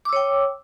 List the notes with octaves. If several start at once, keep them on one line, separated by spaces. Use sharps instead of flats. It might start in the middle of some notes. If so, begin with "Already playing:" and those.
C#5 G5 D6 E6